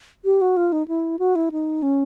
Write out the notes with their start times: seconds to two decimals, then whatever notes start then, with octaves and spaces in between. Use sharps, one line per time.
0.25 G4
0.41 F#4
0.57 F4
0.72 D#4
0.88 E4
1.19 F#4
1.35 E4
1.52 D#4
1.82 C#4